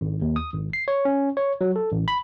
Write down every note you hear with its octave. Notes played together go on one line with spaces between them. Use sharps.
G#1
D#2
D#6
G#1
C7
C#5
C#4
C#5
F#3
A4
A1
B5